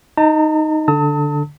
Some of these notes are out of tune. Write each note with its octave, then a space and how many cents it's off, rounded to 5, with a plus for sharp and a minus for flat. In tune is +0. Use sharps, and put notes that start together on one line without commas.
D#4 +0 A5 +45
D3 +0 A5 +30 D#6 +45